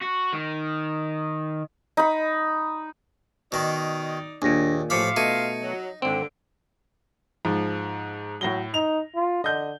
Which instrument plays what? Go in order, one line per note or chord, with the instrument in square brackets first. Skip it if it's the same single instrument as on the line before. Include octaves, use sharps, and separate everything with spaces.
[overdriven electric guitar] F#4
D#3
[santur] D#4 B5
[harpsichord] B2 D#3 [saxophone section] D#4 D5
[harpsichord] D#2 [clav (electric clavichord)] A#2 G#4 [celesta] D4 A#6
[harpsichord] A1 F3 B5 [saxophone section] F4 E5 F5 [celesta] D6 C#7
[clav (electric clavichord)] B2 A3 [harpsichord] D#4 [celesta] G#6 C#7 D#7
[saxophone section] F#3
[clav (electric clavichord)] G#1 C4 [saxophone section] D3 [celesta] D7
[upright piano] G#2 F3
[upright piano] A2 A#6 G7 [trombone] F#3
[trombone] D#4 [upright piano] F7
[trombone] F4
[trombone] D3 [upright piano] D#5 G6